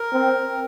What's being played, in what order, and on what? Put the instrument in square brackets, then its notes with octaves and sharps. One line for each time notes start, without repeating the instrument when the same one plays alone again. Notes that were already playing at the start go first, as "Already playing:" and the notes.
Already playing: [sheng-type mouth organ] A#4
[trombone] C4